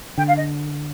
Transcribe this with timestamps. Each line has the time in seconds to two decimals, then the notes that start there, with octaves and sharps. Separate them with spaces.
0.17 D3 G5
0.28 F5
0.37 D#5